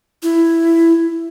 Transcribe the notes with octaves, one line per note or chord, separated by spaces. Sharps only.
E4